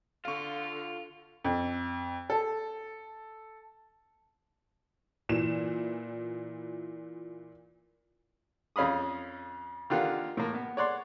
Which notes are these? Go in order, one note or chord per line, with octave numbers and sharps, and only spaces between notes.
D3 F4 A4 F5 C#6
F2
A4
A#2 E3 E7
F2 C#4 F5 B5 D#6
D3 D#3 F4 G4 F5 F#5
A2 A#3
B3
C#5 D5 F#5 C6